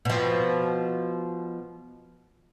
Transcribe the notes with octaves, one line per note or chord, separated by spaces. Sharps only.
B2 F3